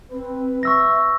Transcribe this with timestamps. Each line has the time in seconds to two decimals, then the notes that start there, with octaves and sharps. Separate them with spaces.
0.12 C4 B4
0.63 E5 C#6 E6 A#6